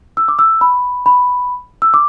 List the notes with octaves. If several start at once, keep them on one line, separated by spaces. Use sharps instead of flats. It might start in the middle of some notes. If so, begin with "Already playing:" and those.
E6
D6
E6
B5
B5
E6
D6